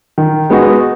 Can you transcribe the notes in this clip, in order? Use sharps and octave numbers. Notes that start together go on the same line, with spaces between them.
D#3
G#3 B3 D#4 F#4